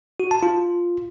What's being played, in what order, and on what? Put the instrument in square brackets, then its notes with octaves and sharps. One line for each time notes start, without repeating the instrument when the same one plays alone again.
[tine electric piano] F#4
A5
F4